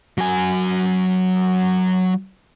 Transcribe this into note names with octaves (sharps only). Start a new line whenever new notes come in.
F#3 G#5